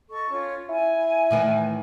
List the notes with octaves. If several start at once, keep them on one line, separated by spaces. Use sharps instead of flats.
A4 D#5 C#6
C#4 F4
E4 G#5
A2 D#3 E3